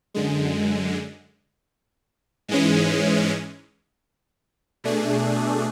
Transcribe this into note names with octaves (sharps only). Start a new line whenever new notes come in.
F#2 D3 G#3
G#2 E3 G#3 C#4
B2 A3 D4 G#4